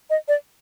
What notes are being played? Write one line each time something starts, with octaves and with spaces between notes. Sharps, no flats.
D#5
D5